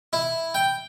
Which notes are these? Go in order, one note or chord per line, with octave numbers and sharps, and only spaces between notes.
E4
G5